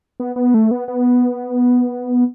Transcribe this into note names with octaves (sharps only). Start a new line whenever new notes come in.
B3
B3
A3
B3
B3